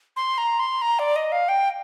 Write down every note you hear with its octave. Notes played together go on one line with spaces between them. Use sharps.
C6
A#5
C6
A#5
D5
D#5
F5
G5